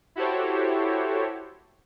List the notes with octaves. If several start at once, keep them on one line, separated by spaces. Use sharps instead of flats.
E4 F#4 G4 A4 C5 C#5